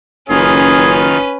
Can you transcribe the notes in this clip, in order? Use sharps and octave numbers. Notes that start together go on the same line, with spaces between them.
F#1 D#3 C#4 F4 G#4 B4